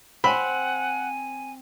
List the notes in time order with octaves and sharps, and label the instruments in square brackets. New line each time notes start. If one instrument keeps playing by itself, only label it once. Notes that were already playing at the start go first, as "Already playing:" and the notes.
[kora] C4 [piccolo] F#5 [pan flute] G#5 [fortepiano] B5